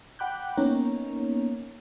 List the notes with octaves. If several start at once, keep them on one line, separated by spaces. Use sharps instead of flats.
F#5 G5 B5 D6 F#6 G6
A#3 B3 C#4 D#4 C#5 A#5